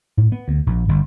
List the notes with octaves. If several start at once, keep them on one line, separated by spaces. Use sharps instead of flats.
A2
B3
D2
A#1
G1